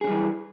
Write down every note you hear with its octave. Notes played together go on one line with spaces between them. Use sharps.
E3 G3 C#4 G#4